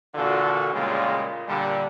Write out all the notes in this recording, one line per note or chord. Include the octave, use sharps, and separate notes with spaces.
A#2 D3 E3 F4 F#4 A4
A#2 C#3 G3 G#3 A#3 F4
A#2 D3 G3